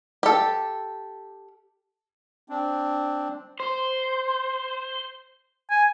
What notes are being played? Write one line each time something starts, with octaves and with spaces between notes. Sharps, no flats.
G4 A4
C4 D4
C5
G#5